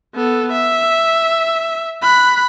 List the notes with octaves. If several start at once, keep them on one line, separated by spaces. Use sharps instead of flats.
B3 A4
E5
B5 F#6